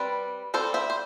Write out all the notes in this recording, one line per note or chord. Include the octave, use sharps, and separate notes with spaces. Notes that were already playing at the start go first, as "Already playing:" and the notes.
Already playing: G3 C4 B4 D5
G3 C4 A4 C5
C5 E5
C5